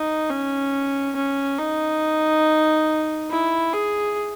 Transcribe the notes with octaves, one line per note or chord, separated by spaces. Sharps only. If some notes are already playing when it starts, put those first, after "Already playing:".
Already playing: D#4
C#4
C#4
D#4
E4
G#4